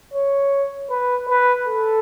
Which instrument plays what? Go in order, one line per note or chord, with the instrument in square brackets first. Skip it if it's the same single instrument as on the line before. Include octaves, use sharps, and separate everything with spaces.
[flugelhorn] C#5
B4
B4
A4